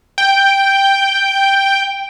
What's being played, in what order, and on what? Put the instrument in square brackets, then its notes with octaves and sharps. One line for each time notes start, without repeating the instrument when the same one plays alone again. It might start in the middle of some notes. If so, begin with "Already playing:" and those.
[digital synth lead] G5